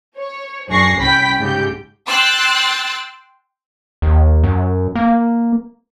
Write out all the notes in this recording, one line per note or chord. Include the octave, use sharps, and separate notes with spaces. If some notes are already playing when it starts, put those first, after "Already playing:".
C#5
F#2 D4 G#4 C#6 A#6 C7
C2 C#4 G5 B5 B6
G#2 C#3 G4 G6
G5 C6 E6 F#6 A6
D#2
F#2
A#3